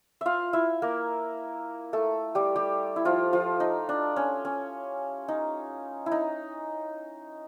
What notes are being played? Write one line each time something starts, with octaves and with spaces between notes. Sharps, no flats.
F4 E5 F5
E4 E5
A#3 A#4
A3 A4
G3 G4
G3 G4
E4
F3 F4
F3 F4
D#4
D4
C#4
C#4
D#4
E4
D#4